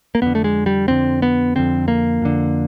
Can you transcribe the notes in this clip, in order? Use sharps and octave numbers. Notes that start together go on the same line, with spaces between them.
A#3
F2 D3 B3
A3
G#3
G3
F2 D3 C4
B3
F2 D3 C4
A#3
F2 D3